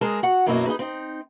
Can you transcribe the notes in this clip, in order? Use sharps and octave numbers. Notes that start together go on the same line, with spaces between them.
G#3 G#4 A#4 A5
F#4 F#5
F#2 B2 F#3 A#3 E4 D#5
D#4 E4 G#4 B4
C4 D#4